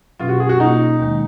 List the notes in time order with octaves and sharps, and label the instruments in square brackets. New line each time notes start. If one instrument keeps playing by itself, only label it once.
[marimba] B2 F#3 C#4 [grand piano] F4
[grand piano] F#4
G#4
F#4
[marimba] B2 A#3 F4 [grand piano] D#4
[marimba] D#2 D#3 G#3